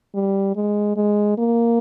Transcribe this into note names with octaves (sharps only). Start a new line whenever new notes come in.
G3
G#3
G#3
A#3